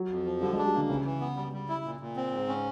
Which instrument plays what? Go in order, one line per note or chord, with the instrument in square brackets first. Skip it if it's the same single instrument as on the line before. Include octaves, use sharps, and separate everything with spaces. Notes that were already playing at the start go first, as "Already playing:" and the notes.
Already playing: [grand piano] F#3
[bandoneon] F2
F3
[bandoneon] D3 [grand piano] G3
[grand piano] G#3
[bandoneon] D4
[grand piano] G3
[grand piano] D3 [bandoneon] A#3
[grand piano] C#3 [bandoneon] E3
[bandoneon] E3
B3
G3
G3
E4
A#2
A#2
C4
G#2
C#4